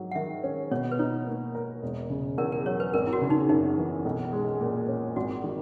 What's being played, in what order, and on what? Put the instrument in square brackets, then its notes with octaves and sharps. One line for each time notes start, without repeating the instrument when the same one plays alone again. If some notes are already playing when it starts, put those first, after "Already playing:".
Already playing: [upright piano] G#2 F#3
[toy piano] F#5
[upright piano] D#3 [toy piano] E5
[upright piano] C#4
[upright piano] B2 [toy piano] C#5
[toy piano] B4
[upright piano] D#4 [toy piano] C#5
[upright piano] A#3
A#4
E1
C#3
[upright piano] E2 [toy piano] A#4
[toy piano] A#4
[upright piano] F#3 [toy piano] C#5
[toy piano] B4
[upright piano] G#1 [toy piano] A#4
[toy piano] E4
F#4
[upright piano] C#3
[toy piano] D#4
[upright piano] F#2 [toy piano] D#4
[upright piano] E3
B1
G#3
A#2
C#4
[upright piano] G#1 [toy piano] F#4
[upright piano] D#3